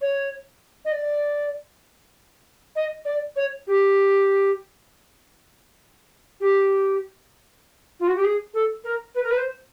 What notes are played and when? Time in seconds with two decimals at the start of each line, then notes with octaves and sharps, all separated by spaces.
0.01 C#5
0.85 D#5
0.91 D5
2.75 D#5
3.05 D5
3.36 C#5
3.67 G4
6.40 G4
7.99 F4
8.07 F#4
8.16 G4
8.23 G#4
8.53 A4
8.84 A#4
9.15 B4
9.23 A#4
9.30 B4
9.37 C5